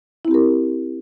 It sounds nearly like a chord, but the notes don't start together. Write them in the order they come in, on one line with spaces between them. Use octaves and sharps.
E4 C4 G4 A#4